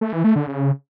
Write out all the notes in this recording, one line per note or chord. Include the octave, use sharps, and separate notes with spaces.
A3
E3
A3
D3
C#3